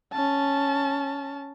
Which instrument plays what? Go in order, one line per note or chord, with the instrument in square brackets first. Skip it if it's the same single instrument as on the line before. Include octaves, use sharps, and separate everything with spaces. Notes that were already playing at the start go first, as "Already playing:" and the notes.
[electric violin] C#4 A5